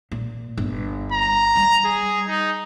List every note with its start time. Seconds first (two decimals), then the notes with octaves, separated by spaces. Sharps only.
0.11 A#2
0.58 G1
1.12 A#5
1.56 G3
1.85 G#4
2.28 D#4